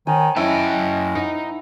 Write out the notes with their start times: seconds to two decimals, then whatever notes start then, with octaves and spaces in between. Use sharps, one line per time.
0.07 D#3 C#5 G#5
0.36 F#2 C#4 E4 D#5 G5 A5
1.15 D#4 F#5